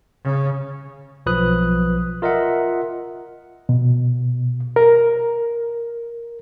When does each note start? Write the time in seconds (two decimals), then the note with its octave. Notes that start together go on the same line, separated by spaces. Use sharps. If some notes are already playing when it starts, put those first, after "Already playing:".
0.24 C#3
1.26 B1 F3 B4 D#6 F#6
2.22 F4 A#4 D#5 E5 F#5
3.69 B2
4.76 A#4